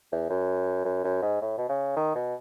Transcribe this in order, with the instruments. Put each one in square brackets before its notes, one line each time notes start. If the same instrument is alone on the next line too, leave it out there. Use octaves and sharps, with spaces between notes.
[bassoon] E2
F#2
F#2
F#2
G#2
A2
B2
C#3
D#3
B2